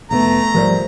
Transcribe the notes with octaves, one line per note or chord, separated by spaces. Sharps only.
F1 C3 A3 B3 A#5
G#1 F3 G3 A#4 C5 D5